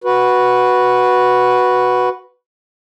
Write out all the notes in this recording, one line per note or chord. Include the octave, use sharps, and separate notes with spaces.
F#4 B4